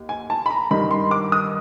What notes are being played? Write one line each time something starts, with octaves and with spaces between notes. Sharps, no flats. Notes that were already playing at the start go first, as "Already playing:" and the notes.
Already playing: D#2
G#5
A5
B5
A#5
G2 D#3 G3 B5
C6
D6
D#6